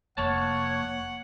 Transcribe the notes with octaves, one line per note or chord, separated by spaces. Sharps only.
F1 A#3 C#5 F#5 A5